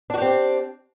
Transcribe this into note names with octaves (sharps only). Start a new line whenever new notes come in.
C4 D4 F#4 G4